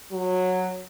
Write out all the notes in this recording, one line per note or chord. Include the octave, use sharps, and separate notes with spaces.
F#3